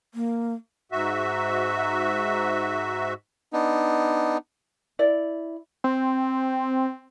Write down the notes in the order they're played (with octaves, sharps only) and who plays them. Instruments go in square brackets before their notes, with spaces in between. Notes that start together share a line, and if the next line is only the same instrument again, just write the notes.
[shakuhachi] A#3
[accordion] G#2 F#4 E5
[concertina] B3 D4 D#4
[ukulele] E4 D5
[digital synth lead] C4